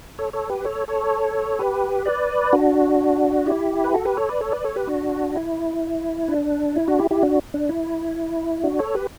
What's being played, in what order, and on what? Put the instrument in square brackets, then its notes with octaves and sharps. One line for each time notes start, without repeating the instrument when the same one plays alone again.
[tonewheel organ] A4 C#5
A4 C#5
G4 B4
A4 C#5
A4 C#5
G4 B4
B4 D5
D4 F#4
E4 G4
B4
F#4 A4
G4 B4
A4 C#5
B4 D5
A4 C#5
B4 D5
A4 C#5
G4 B4
D4 F#4
E4
D4
E4
D4 F#4
E4 G4
E4 G4
D4 F#4
D4
E4
D4 F#4
A4 C#5
G4 B4